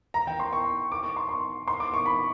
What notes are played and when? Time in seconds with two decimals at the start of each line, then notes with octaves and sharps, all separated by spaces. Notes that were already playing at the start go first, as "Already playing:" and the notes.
0.14 A#5
0.27 G5
0.40 C6
0.53 C#6
0.92 D6
1.03 C#6
1.16 C6
1.29 C6
1.68 C6
1.80 D6
1.94 C#6
2.06 B5